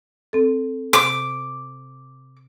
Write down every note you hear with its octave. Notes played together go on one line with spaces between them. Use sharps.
C4 A4
C3 D6